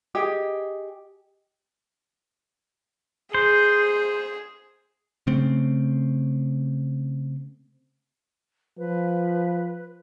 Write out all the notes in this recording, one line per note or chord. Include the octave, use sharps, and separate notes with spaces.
G4 G#4 D#5
G#4 C5
C#3 A3 C4
F3 B4